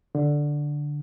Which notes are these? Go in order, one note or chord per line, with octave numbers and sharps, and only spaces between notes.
D3